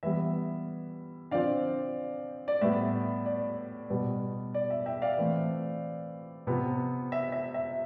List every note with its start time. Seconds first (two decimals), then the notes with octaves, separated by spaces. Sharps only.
0.03 E3 G3 B3 E5
1.31 D3 F3 C4 D5 F5
2.48 D5
2.61 A2 G3 B3 E5
3.26 D5
3.90 B2 G3 B3
4.54 D5
4.70 E5
4.86 E5 G5
5.02 D5 F5
5.18 E3 A3 C4
6.47 C3 F3 B3
7.12 E5
7.32 E5
7.54 E5